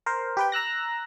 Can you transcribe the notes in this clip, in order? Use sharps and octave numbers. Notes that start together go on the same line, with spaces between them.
A#4 C5
G4 B4 G5
A#5 E6 F#6 A#6